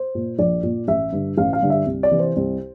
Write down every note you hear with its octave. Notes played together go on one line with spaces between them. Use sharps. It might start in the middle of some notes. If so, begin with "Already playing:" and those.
Already playing: C5
A#2
A#1 D5
A#2
A1 E5
G2 D3
A1 F5
F5
G2 D3
E5
C2
D5
C3 E3
C5
C2